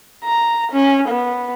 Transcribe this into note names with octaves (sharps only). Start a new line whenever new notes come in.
A#5
C#4
B3